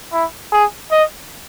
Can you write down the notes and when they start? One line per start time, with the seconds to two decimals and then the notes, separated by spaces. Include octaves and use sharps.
0.12 E4
0.52 G#4
0.91 D#5